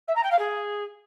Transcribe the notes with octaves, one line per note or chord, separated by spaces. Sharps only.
E5
A#5
G5
F5
G#4